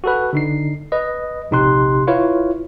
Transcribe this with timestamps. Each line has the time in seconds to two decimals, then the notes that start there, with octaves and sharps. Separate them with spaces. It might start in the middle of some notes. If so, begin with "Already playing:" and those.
0.04 F#4 A4 B4
0.33 D3 D#4 C7
0.92 B4 D#5
1.51 A#1 C3 D#4 G4 C6 F#6
2.07 E4 F4 B4 C#5 F5